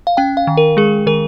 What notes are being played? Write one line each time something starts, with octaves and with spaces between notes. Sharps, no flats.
F5
C#4 G5
F5
D#3
A#4
G#3 G#4
D#3 A#4